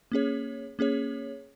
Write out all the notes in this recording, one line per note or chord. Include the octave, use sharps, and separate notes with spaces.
A#3 C#4 G#4 C#5
A#3 C#4 G#4 C#5